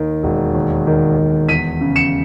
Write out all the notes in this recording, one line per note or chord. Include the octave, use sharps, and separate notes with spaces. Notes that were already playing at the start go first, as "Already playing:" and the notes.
Already playing: D#2 D#3
E1
D#2
D#3
E1
E2 B6 D#7
C#3
C#7 E7